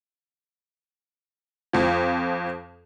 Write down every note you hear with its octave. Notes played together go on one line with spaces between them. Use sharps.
F2 F3